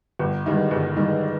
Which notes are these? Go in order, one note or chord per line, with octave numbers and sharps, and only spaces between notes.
G1
G2 D#3 G#3
G1
G2 D#3 G#3